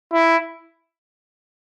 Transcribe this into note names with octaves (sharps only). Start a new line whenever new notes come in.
E4